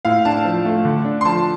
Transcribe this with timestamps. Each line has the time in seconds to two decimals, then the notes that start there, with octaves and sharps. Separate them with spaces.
0.05 A2 F5
0.25 D4 A5
0.45 F3
0.65 A3
0.85 D3
1.05 D4
1.21 C6
1.25 F3 A5